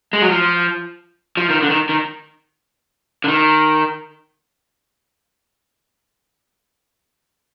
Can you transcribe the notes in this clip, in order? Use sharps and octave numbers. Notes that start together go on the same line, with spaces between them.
G#3
F#3
F3
F3
D#3
D3
D#3
D#3
D3
D#3